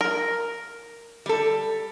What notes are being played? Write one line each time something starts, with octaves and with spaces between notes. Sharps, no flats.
A#4
G3 A4